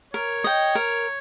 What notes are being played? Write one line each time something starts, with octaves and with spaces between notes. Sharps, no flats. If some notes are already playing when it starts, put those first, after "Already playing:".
A#4 C#5
D#5 G5
A#4